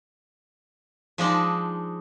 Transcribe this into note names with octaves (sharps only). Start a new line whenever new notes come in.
F3 G#3 D4 D#4